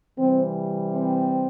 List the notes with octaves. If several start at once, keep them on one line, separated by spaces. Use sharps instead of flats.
C3 E3 G3 C4
C4